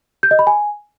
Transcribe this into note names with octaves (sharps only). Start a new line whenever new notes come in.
G6
D#5
B5
G#5